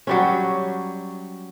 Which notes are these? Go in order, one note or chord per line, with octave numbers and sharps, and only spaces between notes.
F#3 G3 C#4